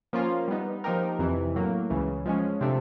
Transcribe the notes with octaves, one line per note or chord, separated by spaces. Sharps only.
F3 A#3 C#4 F4
G3 B3 D#4
F3 A#3 D#4 G4 A#4
F2 C3 E3
A2 F#3 A#3
C#2 C#3 E3
F3 G#3 C#4
C3 F3 A3 D4